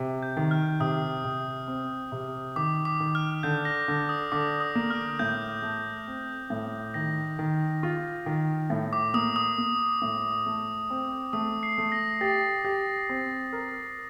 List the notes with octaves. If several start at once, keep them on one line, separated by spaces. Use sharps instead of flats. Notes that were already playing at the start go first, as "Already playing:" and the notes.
Already playing: C3
G6
D#3
F6
C3 D#6
C3
C4
C3
D#3 D6
D6
D#3
F6
D3 G6
A#6
D3
D#6
D3 D6
D#6
A#3
F6
A2 G6
A3
C4
A2
D#3 A#6
D#3
F4
D#3
A2
D6
A#3 D#6
D#6
A#3
A2
A3
C4
A3 D#6
C7
A3
A#6
G4 A6
G4
C4
A#4